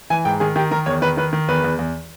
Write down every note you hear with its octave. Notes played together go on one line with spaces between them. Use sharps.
E3 G#5
G#2 G5
D#3 G#4
D#3 G4
D#3 A#4
E2 C#5
D#3 B4
D#3 B4
D#3
E2 B4
E2
E2